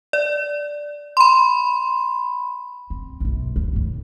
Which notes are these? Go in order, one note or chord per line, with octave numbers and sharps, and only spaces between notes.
D5
B5 C6
C4
B1 F#2
D2
A2 D#3